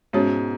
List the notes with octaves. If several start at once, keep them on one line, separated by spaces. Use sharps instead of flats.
G#2 B2 G#3 C#4 F#4 C#5